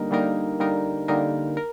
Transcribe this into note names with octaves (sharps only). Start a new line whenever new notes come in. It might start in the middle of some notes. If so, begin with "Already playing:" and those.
Already playing: D3 G3 A#3 D#4 A#4
D3 G3 A#3 D#4 A#4
D3 G3 A#3 D#4 A#4
D3 G3 A#3 D#4 A#4
A#4